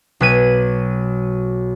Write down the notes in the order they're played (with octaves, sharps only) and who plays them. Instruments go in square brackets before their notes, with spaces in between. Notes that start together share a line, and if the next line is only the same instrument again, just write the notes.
[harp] B1 B4 G#6 D#7